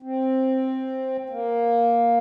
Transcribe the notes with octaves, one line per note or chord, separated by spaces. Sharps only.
C4
A#3